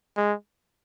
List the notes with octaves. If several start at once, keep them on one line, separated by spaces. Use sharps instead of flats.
G#3